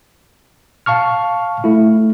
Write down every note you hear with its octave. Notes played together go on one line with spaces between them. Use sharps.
F5 A5 C#6 F6
A3 E4